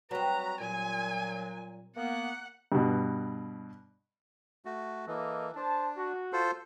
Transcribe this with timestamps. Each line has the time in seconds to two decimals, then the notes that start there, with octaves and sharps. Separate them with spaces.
0.11 F#3 G3 C4 F#4 B4 A#5
0.60 A#2 F#3 G#5
1.96 A#3 B3 F#5
2.72 G2 B2
4.65 A3 F#4
5.07 E3 A#3 A4 D#5
5.56 D4 C5 A5
5.97 F#4
6.33 F4 A4 C5